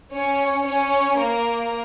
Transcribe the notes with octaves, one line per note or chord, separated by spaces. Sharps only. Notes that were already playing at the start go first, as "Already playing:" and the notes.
C#4 C#5
C#4 C#5
A#3 A#4